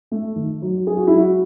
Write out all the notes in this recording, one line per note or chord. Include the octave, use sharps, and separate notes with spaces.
A3
D#3
F#3
F#3 G#4
F#4
F#3 E4
F#4